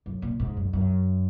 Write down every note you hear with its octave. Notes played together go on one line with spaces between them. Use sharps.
F#2
A#2
G#2
F#2
F#2